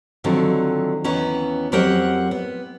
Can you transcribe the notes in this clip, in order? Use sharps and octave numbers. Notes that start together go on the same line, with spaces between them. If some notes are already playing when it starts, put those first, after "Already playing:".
D3 D#3 F3 F#3 C4
D#2 D#3 E3 B3 C#4 A#5
F2 F#3 G4 A#4 C5 F#5
B3